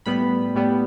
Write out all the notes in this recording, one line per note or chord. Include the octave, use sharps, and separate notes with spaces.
A2 G3 B3 B5
A2 G3 B3